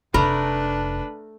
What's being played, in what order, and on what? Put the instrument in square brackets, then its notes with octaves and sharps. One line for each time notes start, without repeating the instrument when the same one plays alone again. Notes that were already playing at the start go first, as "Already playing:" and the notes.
[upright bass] F1 [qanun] A3 A#4 A#5 [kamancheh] D4 B4 [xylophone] B5